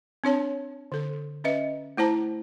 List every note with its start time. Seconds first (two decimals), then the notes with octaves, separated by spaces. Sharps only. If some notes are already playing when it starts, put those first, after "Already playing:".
0.24 C4 D4 C#5 A5
0.92 D3 A4
1.44 C#4 B4 D#5 E5
1.97 A3 E4 C5 A5 A#5